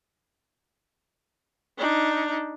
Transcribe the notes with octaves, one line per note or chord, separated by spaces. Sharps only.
D4 D#4